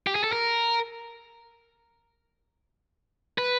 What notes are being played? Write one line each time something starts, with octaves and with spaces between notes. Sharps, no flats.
G4
G#4
A4
A#4
B4